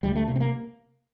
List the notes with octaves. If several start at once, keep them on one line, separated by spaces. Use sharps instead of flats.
D2 G3
A3
C3 A#3
C4
A#3